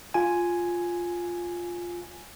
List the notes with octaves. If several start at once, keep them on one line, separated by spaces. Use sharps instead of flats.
F4 G#5